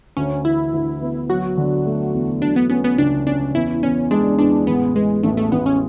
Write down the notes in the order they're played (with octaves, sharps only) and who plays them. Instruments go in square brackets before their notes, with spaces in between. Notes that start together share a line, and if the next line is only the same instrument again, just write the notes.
[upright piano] D2 [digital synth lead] C#4
[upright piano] E3 [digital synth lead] E4
[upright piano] D2
B3
[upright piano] F#3 [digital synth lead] F#4
[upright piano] D3
A3
E2
[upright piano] F#3 [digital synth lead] D4
[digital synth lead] B3
[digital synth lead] B3 [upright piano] C#4
[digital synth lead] B3
[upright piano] C#2 [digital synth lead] D4
[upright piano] C#4 [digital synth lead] D4
[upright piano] E2 [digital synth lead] E4
[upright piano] E2 [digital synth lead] C#4
[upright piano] G#3 [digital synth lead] D4
[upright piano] E2 [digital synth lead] D4
[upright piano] A1 [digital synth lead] B3
[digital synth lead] G#3 [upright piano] B3
[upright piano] A1 [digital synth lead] A3
[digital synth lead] A3
[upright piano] A1 [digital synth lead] B3
[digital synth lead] C#4